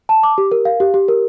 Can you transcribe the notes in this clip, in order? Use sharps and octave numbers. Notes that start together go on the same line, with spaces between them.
A5
D6
G4
A#4
F5
G4
G4
A#4